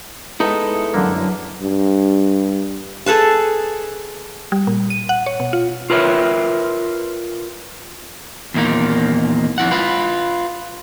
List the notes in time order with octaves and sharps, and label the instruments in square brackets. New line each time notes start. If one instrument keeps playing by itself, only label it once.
[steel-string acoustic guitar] G#3 B3 B4 [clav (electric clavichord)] D#4 [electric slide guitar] E4 A4
[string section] F#2 [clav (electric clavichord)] D3 A#3
[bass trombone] G2
[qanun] G#4 A4 B4 A5
[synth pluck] G3
A#2
D#7
F#5
C#5
B2
F4
[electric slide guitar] F4 A#4 B4 C#5 E5
[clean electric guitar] E2 A#2 D#3 A#3
F2 E4 F#5
F4 B4